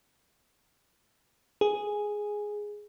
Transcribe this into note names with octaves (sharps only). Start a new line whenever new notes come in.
G#4